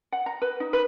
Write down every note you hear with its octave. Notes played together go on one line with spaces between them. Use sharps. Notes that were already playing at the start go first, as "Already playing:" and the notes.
F#5
A#5
B4
D#4
B4